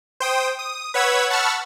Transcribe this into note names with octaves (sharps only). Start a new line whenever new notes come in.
C5 G5 D#6
D#6
B4 C#5 F#5 E6 G#6 B6
F#5 A5 B5 C#6 E6 F6